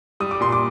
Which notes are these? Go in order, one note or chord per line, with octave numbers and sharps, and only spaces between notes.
G3 D#6
D6
A#2 C6
D6